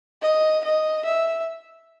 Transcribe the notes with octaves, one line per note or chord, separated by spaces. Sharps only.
D#5
D#5
E5